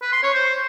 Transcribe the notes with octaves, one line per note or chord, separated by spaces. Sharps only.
B4
C6
C#5
C5